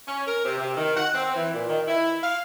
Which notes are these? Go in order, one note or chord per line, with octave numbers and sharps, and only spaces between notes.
C#4
A#4
C3
C3
D#3
F#5
C4
E3
A#2
D#3
E4
F5